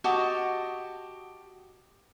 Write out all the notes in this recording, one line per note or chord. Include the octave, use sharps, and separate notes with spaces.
F#4 G4 D#5 A5